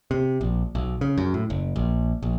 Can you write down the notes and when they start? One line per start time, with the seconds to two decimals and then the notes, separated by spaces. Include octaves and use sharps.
0.11 C3
0.41 A#1
0.75 B1
1.01 C#3
1.17 F#2
1.34 A2
1.50 F#1
1.76 A#1
2.23 A#1